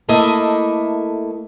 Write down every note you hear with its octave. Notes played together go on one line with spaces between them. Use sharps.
A3 A#3 E4 A4 D#5 E5